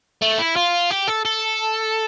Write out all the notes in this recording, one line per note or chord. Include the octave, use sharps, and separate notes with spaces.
A3
E4
F4
G4
A4
A4